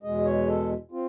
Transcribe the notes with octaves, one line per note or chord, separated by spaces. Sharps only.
E2 B2 G#3 D#5
C#5
A4
C4 F4